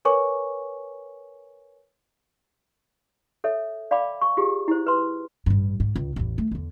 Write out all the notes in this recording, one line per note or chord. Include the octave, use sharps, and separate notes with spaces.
A#4 B4 C#5 G#5 C#6 D6
A4 C#5 E5
D5 F5 G5 B5 D6
C#6
F4 G4 G#4
E4 C5
B4 C6
A1 G2
G#2
C#2
A1 E2
A3
E2 D3